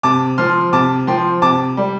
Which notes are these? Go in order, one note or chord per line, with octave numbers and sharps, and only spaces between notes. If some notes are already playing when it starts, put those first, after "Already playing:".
C3 A5 D6
F3 C6 F6
C3 A5 D6
F3 G5 C6
C3 A5 D6
G3